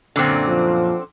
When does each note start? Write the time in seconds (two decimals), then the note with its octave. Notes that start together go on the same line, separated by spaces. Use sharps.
0.16 F#2 A#2 D3 F#3 C4
0.48 F3